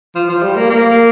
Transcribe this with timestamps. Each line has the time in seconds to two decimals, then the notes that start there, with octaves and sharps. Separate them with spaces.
0.15 F3
0.29 F3
0.43 G3
0.56 A#3
0.70 A#3